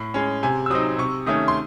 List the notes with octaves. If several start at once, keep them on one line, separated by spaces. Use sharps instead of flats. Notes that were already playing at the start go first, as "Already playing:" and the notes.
Already playing: A2
G#3 C#4
C3 G#5
E6
F#3 C4 D#4 D#6
C3 C#6
D#3 A3 C#4 D#6
C6